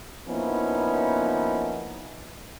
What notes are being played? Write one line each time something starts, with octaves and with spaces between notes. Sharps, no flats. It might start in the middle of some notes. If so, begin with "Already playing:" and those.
F3 A#3 B3 C#4 D#4 E4